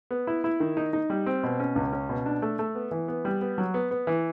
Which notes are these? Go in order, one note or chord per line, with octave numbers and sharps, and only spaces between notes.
B3
E4
E4
D#3
D#4
D#4
G3
C4
B2
C#4
C#2
C#4
B2
D4
A3
A3
B3
E3
B3
G3
B3
F#3
B3
B3
E3